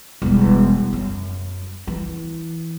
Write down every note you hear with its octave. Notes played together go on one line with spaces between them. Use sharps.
E1 G3
F#2
E3